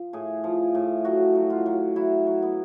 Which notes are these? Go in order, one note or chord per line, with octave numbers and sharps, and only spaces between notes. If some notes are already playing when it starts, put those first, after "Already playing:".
Already playing: F3
A2 G#4
F3
A2
F#3 F#4
F#3
F4
F#3
F#3 E4
F#3
B3